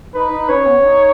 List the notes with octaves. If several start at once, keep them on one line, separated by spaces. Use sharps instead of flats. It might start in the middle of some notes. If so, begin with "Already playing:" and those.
D#4 B4
D#4
C#4 C#5
B3
D#4